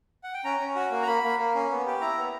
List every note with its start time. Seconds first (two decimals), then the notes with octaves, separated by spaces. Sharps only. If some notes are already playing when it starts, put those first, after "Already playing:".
0.24 F#5
0.34 G5
0.44 C#4 A#5
0.59 C#4
0.76 F#4
0.91 A#3
1.02 A#5
1.07 A#3 B5
1.23 A#3
1.39 A#3
1.55 C#4
1.71 B3
1.86 G4
2.01 E4 A#5
2.18 B3